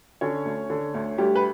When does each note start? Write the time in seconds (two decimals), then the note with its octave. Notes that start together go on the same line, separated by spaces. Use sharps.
0.21 D3 C#4 C#5
0.45 D2
0.70 D3
0.94 D2
1.18 D2 G3 G4
1.36 B4